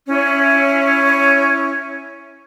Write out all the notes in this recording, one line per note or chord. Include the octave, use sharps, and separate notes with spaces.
C#4 E4 C#5